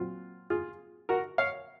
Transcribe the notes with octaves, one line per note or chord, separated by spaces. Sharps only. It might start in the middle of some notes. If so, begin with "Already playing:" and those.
Already playing: A#2 F#3 C4 F4
F4 G#4
F#4 A#4
C#5 F5